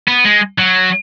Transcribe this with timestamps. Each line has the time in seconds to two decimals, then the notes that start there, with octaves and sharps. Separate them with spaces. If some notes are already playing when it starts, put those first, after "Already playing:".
0.08 B3
0.25 G#3
0.58 F#3